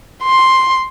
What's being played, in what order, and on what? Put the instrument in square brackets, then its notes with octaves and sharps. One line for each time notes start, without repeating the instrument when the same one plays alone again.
[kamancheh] C6